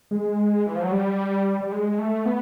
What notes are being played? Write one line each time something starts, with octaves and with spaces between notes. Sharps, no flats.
G#3
E3
F3
F#3
G3
G3
G#3
A3
B3